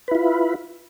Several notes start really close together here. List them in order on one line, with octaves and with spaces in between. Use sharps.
B4 E4 F4